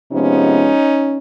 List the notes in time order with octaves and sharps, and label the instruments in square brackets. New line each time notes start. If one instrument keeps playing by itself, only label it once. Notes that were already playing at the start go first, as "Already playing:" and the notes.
[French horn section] C3 F3 G#3 B3 C#4 D#4